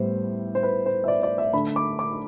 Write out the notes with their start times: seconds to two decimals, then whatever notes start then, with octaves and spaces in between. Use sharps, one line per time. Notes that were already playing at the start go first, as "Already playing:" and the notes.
Already playing: A2 G3 B3 C5
0.55 C5
0.63 B4
0.86 C5
1.04 E5
1.08 D5
1.23 D5
1.38 E5
1.53 D3 A3 B5
1.76 D6
1.99 D6